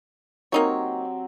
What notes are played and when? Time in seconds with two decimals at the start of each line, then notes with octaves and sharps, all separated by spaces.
0.52 F#3 A#3 C4 D#4 G4 C#5